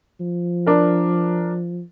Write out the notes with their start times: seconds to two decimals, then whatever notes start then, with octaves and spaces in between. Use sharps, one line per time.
0.20 F3
0.66 D4 A#4